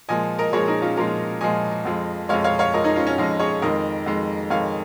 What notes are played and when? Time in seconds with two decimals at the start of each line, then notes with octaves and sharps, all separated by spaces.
0.09 A#2 F3 G#3 D#5 G#5
0.39 A#4 D#5
0.53 A#2 F3 G#3 G#4 C#5
0.68 D#4 G#4
0.82 C#4 F4
0.97 A#2 F3 G#3 F4 A#4
1.41 A#2 F3 G#3 D#5 G#5
1.85 F2 F3 G#3
2.29 F2 F3 G#3 C#5 F5
2.44 C#5 F5
2.59 C#5 F5
2.74 F2 F3 G#3 A#4 D#5
2.84 D#4 G#4
2.96 C#4 F4
3.07 C#4
3.18 F2 F3 G#3 D#4
3.39 G#4 C#5
3.62 F2 D#3 G#3 A#4 D#5
4.06 F2 D#3 G#3
4.50 F2 D#3 G#3 C#5 F5